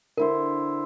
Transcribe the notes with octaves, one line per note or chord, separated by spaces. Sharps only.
D3 E4 A#4 C5